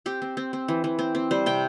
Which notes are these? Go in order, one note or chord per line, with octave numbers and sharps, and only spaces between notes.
C4 G4
C4
C4
C4
E3
E3
C4
C4
G3 C5
C3 G5